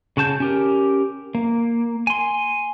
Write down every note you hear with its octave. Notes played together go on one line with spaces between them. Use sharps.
C#3 F#4 A5 G6
C#4 G4 A#4
A#3
G#5 C6